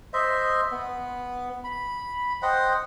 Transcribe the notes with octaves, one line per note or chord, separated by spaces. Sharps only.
C5 D#5 E5
B3
B5
C5 D#5 F#5 G5